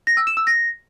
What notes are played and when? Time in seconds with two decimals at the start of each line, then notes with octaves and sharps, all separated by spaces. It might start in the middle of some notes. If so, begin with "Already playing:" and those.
0.07 A#6
0.17 E6
0.27 E7
0.37 E6
0.47 A#6